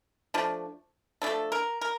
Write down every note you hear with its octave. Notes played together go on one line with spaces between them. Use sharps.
F3 A3 D4
F3 A3 D4 A4
A#4
A#4